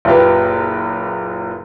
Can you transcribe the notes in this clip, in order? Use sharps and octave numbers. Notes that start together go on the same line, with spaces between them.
F#1 A#2 G4 B4